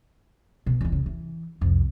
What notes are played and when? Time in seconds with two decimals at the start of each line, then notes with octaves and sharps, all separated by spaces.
0.66 B2
0.81 E2 E3
0.92 C#3
1.06 E3
1.61 C2 F2